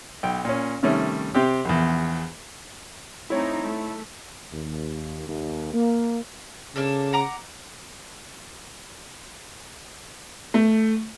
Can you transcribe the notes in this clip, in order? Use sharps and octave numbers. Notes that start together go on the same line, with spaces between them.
B1 G5
A#2 C#4
C3 D#3 G3 A3 C#4
C3 C4 G4
A#1 E2
A3 C4 D#4 E4 C#5
A3
D#2
D#2
A#3
C#3 A#3 D4 A4
F#5 A#5 D6
A3